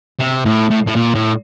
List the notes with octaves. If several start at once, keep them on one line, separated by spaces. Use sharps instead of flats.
C3
A2
A2
A2
A#2
A2